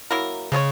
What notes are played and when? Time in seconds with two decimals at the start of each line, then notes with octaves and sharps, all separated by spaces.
0.11 F#3 A#3 E4 A#4
0.52 C#3 G#3 C#4 G#4 C#5